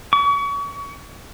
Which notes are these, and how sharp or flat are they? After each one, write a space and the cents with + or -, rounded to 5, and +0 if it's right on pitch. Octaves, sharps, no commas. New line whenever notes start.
C#6 +35